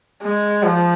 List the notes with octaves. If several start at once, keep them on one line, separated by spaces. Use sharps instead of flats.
G#3
F3